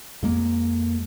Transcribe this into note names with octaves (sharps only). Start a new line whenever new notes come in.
F2 G#3 A#3